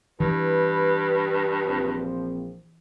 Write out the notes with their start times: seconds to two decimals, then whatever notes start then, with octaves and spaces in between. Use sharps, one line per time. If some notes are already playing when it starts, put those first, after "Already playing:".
0.20 G2 E3 B4
1.64 A#1 F3 C4